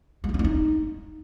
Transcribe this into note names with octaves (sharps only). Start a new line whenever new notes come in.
G#3
A3
C#4
D4
D#4